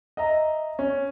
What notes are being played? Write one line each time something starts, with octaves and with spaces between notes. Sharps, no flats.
D#5 E5 A#5
C#4